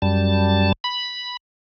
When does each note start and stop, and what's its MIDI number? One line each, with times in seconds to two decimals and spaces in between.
0.02 0.72 42
0.02 0.72 55
0.02 0.72 81
0.84 1.37 83